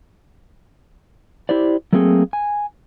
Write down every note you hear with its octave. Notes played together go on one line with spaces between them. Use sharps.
E4 G4 C5 D5
F#3 A3 A#3 C4 G#4 A4
G#5